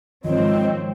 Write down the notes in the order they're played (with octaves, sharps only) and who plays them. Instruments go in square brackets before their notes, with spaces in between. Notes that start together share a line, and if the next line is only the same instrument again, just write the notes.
[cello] G#2 F#3 [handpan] D#3 F3 [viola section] C4 [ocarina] D#5